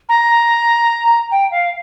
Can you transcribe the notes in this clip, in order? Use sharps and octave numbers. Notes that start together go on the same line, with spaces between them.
A#5
G5
F5